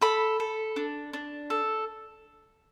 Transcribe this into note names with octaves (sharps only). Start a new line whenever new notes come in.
A4 B5
A4
D4
D4
A4